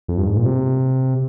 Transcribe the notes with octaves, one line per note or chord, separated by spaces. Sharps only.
F2
G2
G#2
A#2
C3